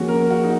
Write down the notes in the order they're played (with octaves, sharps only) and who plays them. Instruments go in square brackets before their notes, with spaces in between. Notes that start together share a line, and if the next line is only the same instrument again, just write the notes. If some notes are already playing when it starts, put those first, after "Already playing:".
Already playing: [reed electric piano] F3 A#3 C#4 G#4 [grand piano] F#4
[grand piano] A#4
F#4
D#4